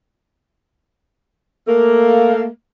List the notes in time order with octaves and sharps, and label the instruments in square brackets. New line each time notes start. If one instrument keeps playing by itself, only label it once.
[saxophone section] A3 A#3